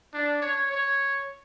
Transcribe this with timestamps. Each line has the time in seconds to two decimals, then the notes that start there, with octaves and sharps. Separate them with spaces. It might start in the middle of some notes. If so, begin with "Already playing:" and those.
0.14 D4
0.42 C#5
0.71 C#5